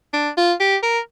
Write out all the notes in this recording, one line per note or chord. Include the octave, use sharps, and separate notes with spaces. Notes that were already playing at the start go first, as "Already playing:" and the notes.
D4
F4
G4
A#4